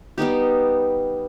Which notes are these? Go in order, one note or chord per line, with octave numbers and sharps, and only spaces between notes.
G3 B3 D#4 G4